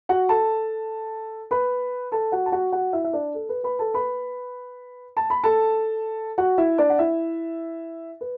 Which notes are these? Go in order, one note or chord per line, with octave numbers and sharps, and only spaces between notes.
F#4 F#5
A4 A5
B4 B5
A4 A5
F#4 F#5
A5
F#4 F#5
F#4 F#5
E4 E5
E5
D4 D5
A4
B4
B4 B5
A4 A5
B4 B5
A5
B5
A4 A5
F#4 F#5
E4 E5
D4 D5
F#5
E4 E5
B4